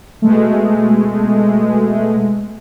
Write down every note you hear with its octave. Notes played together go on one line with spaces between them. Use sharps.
B2 G#3 A3